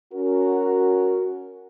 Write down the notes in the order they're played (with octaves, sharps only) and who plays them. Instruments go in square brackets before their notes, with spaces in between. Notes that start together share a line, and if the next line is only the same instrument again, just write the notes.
[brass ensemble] C#4 F#4 A#4